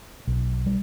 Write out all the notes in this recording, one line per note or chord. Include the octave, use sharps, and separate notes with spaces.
B1
G3